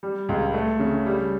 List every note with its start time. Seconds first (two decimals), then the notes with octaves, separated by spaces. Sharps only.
0.03 G3
0.29 C#2
0.54 A3
0.79 C#3
1.06 G3